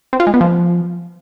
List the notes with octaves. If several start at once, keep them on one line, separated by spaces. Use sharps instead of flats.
C4
F4
G#3
B3
F3